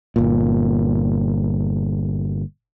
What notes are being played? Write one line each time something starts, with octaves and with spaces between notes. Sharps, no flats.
G1 A#2